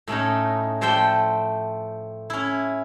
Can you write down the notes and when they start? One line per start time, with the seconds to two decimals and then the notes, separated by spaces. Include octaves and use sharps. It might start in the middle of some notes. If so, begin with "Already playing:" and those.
0.08 A2 A3 C#4 D#4
0.81 F3 A3 C5 D5 G5
2.30 C#4 E4